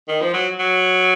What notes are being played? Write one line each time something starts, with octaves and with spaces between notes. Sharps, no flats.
D#3
F3
F#3
F#3